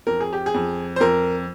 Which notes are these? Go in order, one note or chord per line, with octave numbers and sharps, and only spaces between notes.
F2 A#4
G#4
G4
G#4
F2
C5
F2 A#4